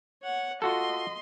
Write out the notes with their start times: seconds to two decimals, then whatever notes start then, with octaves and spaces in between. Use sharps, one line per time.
0.23 C#5 F#5
0.62 F4 F#4 A4 D#5 C6